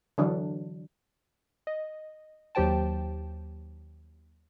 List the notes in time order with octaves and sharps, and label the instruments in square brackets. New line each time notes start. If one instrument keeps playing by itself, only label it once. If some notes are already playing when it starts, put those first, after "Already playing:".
[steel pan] D3 E3 F#3 D4
[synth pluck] D#5
D#2 F#3 G4 C5 G5 A5